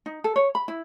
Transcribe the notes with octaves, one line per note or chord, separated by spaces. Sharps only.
D#4
A4
C#5
B5
E4